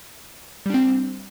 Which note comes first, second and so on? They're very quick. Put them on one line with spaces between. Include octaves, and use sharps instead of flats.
G3 D4 C4